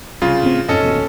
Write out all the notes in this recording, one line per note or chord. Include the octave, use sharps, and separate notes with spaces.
C2 C#3 F4
A2 C4
F2 G#2 C#4 A4 D#5
A1 D#2 B2